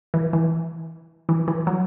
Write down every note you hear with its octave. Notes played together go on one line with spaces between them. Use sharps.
E3
E3
E3
E3
F#3